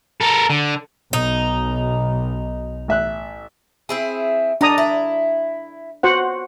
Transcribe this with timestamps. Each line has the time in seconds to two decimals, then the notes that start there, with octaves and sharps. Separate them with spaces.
0.21 A4 A#4
0.50 D3
1.13 B1 D#4
2.88 A1 E5 F#6
3.89 C4 E4 G#4
4.61 D4 D#4 A#5 D#6
4.78 E4
6.03 F#4 C5 F#5